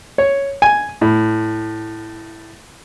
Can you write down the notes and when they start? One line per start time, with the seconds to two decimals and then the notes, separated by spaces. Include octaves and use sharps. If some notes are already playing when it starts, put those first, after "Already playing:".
0.18 C#5
0.62 G#5
1.01 A2